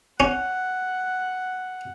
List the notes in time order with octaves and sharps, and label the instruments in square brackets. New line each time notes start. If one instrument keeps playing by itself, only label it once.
[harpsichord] C#4 [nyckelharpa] F#5